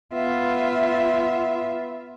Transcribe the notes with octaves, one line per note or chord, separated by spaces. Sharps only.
B3 F4 E5